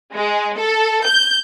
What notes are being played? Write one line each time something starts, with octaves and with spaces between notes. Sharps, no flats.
G#3
A4
G6